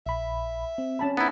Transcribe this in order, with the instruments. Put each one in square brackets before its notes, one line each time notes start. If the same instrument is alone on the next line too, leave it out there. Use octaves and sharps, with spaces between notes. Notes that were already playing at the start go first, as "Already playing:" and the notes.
[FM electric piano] A#1 B5 [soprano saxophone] E5
[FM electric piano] C4
[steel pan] C#4 A5 B5
[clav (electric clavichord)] B3 E4 [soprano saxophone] D#4